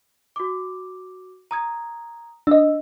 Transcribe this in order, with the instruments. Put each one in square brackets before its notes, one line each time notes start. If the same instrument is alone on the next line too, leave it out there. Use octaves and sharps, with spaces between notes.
[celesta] F#4 D6
A#5 D#6 G#6
[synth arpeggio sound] D4 D#5 [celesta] E6